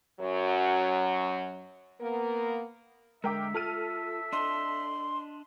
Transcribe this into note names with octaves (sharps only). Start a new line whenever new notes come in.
F#2 F#3
A#3 B3 A#4
D3 G#3 A#4 E5 G5 D6
F4 A4 F6 D#7
D4 D#5 C6